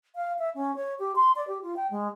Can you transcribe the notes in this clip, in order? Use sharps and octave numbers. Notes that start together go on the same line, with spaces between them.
F5
E5
C#4
C#5
G4
C6
D5
G4
F4
G5
G#3